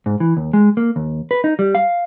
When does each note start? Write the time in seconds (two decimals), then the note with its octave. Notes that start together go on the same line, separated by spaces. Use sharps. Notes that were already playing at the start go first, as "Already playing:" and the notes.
0.06 G#2
0.20 E3
0.37 D#2
0.53 G#3
0.77 A#3
0.96 D#2
1.31 B4
1.44 D#4
1.59 G3
1.75 F5